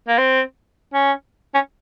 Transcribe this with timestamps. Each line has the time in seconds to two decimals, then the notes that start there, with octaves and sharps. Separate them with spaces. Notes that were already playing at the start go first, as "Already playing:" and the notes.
0.08 A#3
0.18 C4
0.94 C#4
1.55 C#4